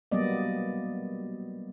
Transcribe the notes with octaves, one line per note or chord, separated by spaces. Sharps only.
F#3 G3 A#3 B3 D5 D#5